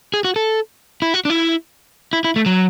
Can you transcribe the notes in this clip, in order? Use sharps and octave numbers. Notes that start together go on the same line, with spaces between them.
G#4
F#4
A4
E4
F#4
D4
E4
E4
E4
A3
F#3